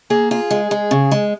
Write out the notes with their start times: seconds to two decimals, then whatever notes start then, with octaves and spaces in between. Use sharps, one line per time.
0.10 A#3 G#4
0.31 F4 G#4
0.51 G#3
0.71 G#3
0.91 C#3
1.11 G#3